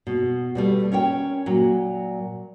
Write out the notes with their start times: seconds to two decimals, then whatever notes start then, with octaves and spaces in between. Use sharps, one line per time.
0.07 B2
0.55 B2 G3 A3
0.92 C#4 A#4 C#5 G5
1.46 A#2 F#3